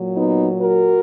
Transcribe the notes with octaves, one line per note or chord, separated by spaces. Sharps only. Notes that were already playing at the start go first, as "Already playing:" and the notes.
Already playing: A#2 F#3
B3 D#4
F#4 A#4